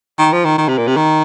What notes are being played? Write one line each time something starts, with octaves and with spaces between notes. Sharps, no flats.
D#3
F3
D#3
D#3
C3
A#2
C3
D#3